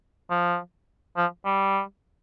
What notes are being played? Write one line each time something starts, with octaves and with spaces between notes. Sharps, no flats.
F3
F3
G3